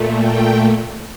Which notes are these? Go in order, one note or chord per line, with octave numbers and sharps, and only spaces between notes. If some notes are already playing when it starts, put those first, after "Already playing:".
Already playing: A#2 A3
G5